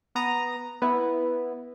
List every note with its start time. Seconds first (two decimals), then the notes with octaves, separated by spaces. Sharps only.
0.15 B3 A#5 D#6
0.82 B3 E4